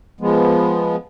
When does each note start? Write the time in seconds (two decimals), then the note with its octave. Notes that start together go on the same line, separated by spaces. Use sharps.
0.21 F3 G#3 B3